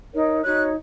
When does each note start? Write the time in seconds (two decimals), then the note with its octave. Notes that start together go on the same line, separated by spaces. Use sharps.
0.12 D#4 A#4 C#5
0.43 D#4 F#4 C#5 F#6